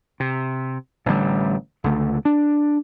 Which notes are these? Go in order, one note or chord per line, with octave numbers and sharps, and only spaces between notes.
C3
A1 D3 F#3 G3
C#2 D3 A3
D4